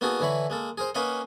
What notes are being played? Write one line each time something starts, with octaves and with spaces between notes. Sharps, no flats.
A#3 B3 D#4 F#4 G#4 A4
D3 E3 E4 C#5 B5
G#3 A#3 A4
G#4 A#4 C5
A#3 C#4 B4 D#5 F5 F#5